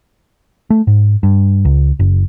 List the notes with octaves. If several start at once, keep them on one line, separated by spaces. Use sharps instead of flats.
A3
G#2
G2
C#2
F#1